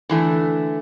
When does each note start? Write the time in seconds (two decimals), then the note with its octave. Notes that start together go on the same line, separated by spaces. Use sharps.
0.09 D3 E3 A3